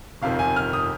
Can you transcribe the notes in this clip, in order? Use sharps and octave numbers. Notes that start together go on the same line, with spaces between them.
G1 F2 C3 D#3 F5
G#5
F6
D#6